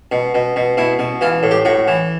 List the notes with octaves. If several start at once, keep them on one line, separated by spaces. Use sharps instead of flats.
B2
B2
B2
B2 E4
B2
E3 F4
A2
G4
A2 F#4
E3